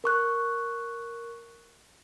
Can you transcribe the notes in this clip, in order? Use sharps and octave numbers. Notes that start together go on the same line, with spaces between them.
A#4 C#6 F#6